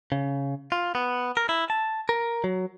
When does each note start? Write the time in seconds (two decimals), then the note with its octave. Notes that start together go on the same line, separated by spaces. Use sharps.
0.12 C#3
0.72 F4
0.95 B3
1.37 A#4
1.49 E4
1.70 A5
2.09 A#4
2.44 F#3